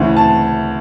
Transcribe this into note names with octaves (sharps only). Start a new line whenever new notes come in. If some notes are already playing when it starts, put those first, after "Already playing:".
Already playing: D2 C#3 E3
A5